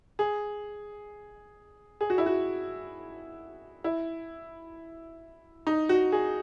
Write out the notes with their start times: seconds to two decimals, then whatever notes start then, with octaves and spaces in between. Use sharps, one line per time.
0.19 G#4
2.01 G#4
2.10 F#4
2.18 E4
2.26 F#4
3.84 E4
5.67 D#4
5.89 F#4
6.12 G#4